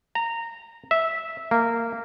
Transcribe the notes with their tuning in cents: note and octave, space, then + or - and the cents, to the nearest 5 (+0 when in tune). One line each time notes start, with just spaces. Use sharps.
A#5 -15
E5 -10
A#3 -15